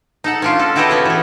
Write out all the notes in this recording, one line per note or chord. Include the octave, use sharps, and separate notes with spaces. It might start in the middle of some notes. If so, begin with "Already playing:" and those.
D#4 A4 F#5
C#4 D4 F4
A4
E4 F#4 G4 A4 B4 D#5
C#3 B3 C#4
E3 G#4